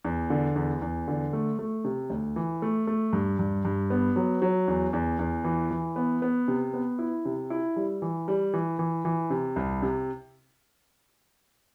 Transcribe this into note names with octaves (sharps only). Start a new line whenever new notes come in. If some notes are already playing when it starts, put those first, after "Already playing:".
E2
D3
E2
E2
D3
A3
A3
C3
D2
E3
A3
A3
G2
G2
G2
B3
F#3
F#3
E2
E2
E2
E3
E3
B3
B3
C3
B3
E4
C3
E4
G3
E3
G3
E3
E3
E3
C3
C2
C3